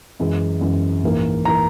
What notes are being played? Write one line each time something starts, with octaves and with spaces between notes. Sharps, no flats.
F#2 E3 G#3 C#4
F#2 E3 G#3 C#4
A#1 G#2 E3 A#3
E3 A#3 A#5